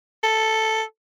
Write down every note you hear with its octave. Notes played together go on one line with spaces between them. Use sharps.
A4